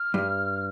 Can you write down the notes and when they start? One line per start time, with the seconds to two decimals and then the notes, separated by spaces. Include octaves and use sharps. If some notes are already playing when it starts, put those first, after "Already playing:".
Already playing: F6
0.14 G2